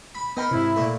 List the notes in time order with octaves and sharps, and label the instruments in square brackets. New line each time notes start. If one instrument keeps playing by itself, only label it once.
[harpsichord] B5
[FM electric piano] B3 G5 B5 [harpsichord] D#4 A#4
[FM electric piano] G#2 C3 [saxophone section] E4
[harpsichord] A#2 A3